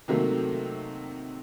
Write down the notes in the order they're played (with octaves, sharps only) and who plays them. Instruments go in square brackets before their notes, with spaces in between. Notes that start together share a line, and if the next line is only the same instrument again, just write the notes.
[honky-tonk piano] C3 D#3 F#3 A3 A#3